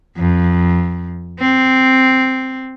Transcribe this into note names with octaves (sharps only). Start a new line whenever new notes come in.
F2
C4